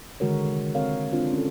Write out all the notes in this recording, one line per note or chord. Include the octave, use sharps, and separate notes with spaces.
D3 D#3 G#3 F#4 A#4 C#5
C3 G#3
C4 A#4 C#5 F5
C4 D4 F4
C#4 A4